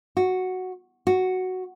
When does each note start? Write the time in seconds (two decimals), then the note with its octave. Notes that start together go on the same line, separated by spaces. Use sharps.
0.17 F#4
1.07 F#4